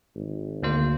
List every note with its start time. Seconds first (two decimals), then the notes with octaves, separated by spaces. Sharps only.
0.15 G#1
0.63 D2 A#3 C5